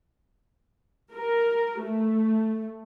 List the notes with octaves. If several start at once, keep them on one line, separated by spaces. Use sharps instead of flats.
A#4
A3